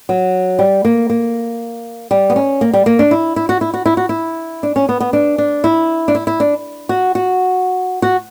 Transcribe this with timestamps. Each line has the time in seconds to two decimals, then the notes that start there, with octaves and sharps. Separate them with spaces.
0.09 F#3
0.59 G3
0.85 A#3
1.10 A#3
2.11 G3
2.30 B3
2.36 C#4
2.61 A#3
2.73 G3
2.86 A#3
2.99 D4
3.11 E4
3.36 E4
3.49 F#4
3.61 E4
3.74 F#4
3.86 E4
3.97 F#4
4.09 E4
4.63 D4
4.76 C#4
4.89 B3
5.00 B3
5.13 D4
5.38 D4
5.64 E4
6.08 D4
6.15 E4
6.27 E4
6.40 D4
6.89 F#4
7.15 F#4
8.02 F#4